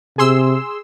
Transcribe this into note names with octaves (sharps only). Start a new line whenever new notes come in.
C3 G#4 C6 E6